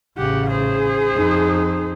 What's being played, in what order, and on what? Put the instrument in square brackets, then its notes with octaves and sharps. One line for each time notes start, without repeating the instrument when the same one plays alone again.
[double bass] A1 C#3 [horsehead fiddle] G4 F#5
[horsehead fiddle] G#4 C5
[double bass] F2 D#4